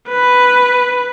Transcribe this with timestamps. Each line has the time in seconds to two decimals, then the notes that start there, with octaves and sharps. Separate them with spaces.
0.08 B4